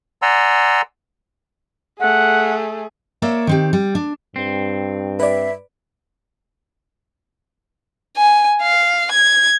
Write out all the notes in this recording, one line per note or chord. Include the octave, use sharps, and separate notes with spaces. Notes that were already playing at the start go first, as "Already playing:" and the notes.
D5 F#5 G#5 A#5 C6 E6
A3 G#4 F#5
A#3 C#5 D5 E5
D#3 C4 G4
G3
D4
G2 C4
B4 D5 E5
G#5
F5
G#6